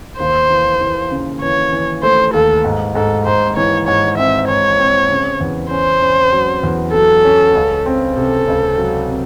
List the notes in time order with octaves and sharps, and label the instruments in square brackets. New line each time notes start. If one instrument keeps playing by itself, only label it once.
[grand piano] D#2 [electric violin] C5
[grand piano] E3
E3
C#3
[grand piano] E3 [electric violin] C#5
[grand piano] E3
[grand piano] A3 [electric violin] C5
[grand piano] D#2 [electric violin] A4
[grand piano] G#2
[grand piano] G#2 [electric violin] A4
[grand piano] G#2 [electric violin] C5
[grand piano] E3 [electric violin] C#5
[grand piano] G#2 [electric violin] C#5
[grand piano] C4 [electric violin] E5
[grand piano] G#2 [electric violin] C#5
[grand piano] C4
C#3
E2
[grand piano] C#4 [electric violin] C5
[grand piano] C#4
F#3
E2
[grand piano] F#3 [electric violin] A4
[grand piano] C#4
C#2
C4
[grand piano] C3 [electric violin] A4
[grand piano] C#2
F#3
C3